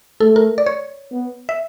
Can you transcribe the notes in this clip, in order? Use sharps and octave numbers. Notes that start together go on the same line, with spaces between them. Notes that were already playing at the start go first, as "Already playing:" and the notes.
A3 A4
A#4
D5
C#5
B3
E5